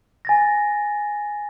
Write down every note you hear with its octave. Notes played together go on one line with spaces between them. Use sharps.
G#5 A6 A#6